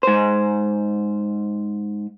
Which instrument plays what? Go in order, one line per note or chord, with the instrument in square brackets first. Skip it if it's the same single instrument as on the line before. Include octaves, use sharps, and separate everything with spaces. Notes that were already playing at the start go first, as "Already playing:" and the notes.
[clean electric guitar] G#2 C5